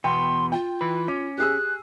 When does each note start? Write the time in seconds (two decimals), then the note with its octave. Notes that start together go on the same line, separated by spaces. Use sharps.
0.04 E2 B2 B3 G5 C6
0.52 F4 G5
0.81 E3 B4
1.08 C#4 D6
1.38 G4 G#4 E6 F#6